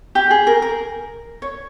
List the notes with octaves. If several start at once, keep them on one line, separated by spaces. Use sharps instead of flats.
G4
G#4
A#4
A#4
C#5